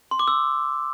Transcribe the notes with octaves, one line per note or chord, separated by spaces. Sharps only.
C6
D6
E6